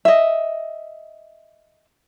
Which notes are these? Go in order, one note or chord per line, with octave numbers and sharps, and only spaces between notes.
D#5 E5